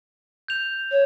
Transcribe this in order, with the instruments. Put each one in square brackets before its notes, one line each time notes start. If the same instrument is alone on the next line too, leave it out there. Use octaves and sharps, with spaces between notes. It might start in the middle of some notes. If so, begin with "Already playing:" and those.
[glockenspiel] G6 F7
[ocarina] C#5